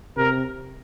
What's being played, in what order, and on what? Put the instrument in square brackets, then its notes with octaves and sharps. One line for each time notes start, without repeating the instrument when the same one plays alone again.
[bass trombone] C3 [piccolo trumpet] A#4